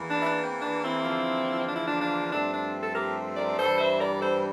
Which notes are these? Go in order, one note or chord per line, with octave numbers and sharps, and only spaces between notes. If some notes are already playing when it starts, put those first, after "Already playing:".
Already playing: E2 E3 A#3
D4
E4
D4
C4
D4
C4 E4
E2 D3 F3 A#3
D4
E4
D4
D4
G2 F3 A3 C4 D4
D4
A4
G4 A#4
A#4 D5
G2 E3 G3 A4 C5
C5 E5
A#4 D5
A4 C5